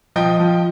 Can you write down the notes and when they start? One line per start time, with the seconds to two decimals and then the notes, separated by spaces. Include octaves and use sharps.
0.16 F3 D#5 G5
0.40 F3